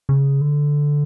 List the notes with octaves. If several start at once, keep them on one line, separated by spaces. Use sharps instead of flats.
C#3
D3